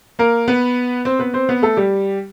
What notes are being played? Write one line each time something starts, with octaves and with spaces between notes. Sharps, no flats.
A#3 A#4
B3 B4
C4 C5
B3 B4
C4 C5
B3 B4
A3 A4
G3 G4